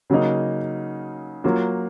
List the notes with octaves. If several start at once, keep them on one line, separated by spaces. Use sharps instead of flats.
C#3 F#3 A#3 D#4
F#3 A#3 F4